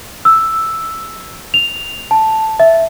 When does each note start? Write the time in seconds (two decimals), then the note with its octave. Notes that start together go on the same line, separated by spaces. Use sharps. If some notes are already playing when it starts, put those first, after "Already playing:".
0.25 E6
1.54 F7
2.11 A5
2.60 E5